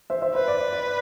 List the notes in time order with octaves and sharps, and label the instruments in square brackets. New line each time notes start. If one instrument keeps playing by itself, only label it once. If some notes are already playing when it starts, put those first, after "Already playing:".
[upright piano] C5 E5
C5 E5
[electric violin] B4 [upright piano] C5
[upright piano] D5
D5
D5